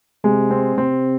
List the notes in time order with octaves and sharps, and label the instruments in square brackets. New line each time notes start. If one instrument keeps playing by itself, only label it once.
[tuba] C3 [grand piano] G#3
[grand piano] C4
[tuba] C3 [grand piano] C4